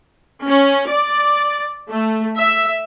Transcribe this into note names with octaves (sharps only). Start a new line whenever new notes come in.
C#4
D5
A3
E5